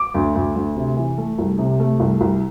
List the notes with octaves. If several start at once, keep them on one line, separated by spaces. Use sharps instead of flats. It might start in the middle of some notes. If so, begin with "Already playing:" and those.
Already playing: D6
D2
D2
D2
C3
E3
A3
C2
C3
A3
C2
C2